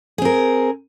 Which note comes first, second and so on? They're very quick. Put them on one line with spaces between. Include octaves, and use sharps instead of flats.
G#4 C4 A#4